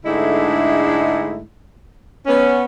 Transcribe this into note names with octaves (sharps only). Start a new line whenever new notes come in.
G#2 D3 G#3 A3 D4 E4
B3 C#4